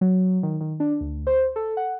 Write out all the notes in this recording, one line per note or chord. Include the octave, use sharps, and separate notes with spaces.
F#3
D#3
D#3
D4
D2
C5
A4
F#5